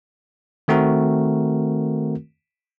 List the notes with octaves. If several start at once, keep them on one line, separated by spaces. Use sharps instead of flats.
D#3 A3 C4 F#4 A#4